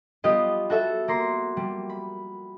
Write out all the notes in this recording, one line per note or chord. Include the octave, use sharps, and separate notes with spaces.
G3 B3 F4 G4 D#5
F#4 A4 E5
A#3 A#5 C6
G3
B5